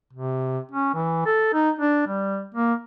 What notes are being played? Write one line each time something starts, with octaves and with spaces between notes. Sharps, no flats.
C3
C#4
E3
A4
D#4
D4
G3
A#3